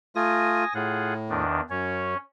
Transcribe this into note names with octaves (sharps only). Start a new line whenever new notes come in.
A3 F4 G#5 D#6 A#6
A2 F4 G#4 F#5
E2 D#3 D4
F#2 C#4 C#5